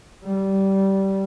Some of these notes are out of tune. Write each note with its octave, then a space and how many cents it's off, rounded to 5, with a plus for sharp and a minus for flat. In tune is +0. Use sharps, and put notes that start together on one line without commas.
G3 -15